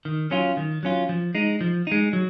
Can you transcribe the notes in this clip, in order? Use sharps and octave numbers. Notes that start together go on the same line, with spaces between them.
D#3
F#3 C#4 F4
D#3
F#3 C#4 F4
F3
G#3 D#4
F3
G#3 D#4
F#3